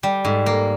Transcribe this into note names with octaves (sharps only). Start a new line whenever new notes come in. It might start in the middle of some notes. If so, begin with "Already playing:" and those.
G3
G#2
A#3